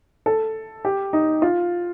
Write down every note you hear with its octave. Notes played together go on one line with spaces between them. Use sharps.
A4
G4
D#4
F4